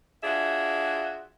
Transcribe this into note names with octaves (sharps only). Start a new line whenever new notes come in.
D4 F4 F#4 G#4 E5